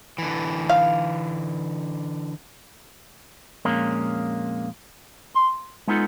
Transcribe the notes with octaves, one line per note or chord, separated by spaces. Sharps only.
D3 E3
F5
F2 A#2 G#3 A#3 C#4 A#4
C6
G#3 B3 D#4 F4 A4